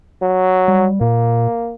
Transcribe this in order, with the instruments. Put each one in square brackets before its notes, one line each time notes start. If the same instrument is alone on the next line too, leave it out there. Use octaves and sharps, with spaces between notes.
[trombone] F#3
[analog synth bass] G3
[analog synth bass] A#2 [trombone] A#3